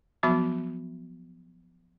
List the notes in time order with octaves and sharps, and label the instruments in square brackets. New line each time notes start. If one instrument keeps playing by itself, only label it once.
[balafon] F3 F#3 B3 F#4 E5 B5